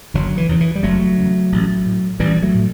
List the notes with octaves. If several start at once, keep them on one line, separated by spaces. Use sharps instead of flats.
F#1 D3 F#3
E3
E2 C#3
E3
G3
F#1 F#3 A3
E2 C#3
A1
A2
A1 E3 G3
F#3 A3
A2